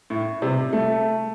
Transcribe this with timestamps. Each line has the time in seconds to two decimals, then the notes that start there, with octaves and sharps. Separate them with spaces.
0.10 A2
0.42 C3
0.73 A3